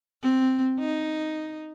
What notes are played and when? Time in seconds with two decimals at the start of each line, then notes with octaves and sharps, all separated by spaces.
0.23 C4
0.79 D#4